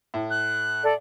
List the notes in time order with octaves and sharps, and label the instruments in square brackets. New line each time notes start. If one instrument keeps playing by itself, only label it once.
[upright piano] A2
[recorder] F#6
[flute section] A4 D5